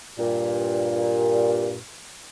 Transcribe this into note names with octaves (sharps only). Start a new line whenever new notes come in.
G2 A#2